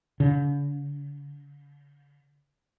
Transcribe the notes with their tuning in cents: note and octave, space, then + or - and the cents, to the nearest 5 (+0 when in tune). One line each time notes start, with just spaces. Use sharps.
D3 -45